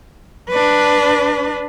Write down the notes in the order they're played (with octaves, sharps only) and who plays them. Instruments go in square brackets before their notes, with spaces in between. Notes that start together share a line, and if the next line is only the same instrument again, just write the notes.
[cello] D4 B4